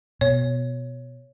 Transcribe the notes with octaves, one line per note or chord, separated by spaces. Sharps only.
B2 C#5